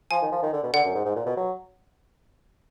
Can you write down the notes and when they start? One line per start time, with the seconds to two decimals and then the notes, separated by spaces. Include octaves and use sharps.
0.11 F3 G#5
0.22 D#3
0.32 F3
0.43 D#3
0.53 D3
0.63 B2
0.73 D3 F#5
0.84 F#2
0.95 G#2
1.05 G#2
1.15 A#2
1.26 B2
1.37 F#3